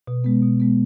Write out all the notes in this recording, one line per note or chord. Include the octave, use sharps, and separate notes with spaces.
B2
G#3 B3
B2
G#3 B3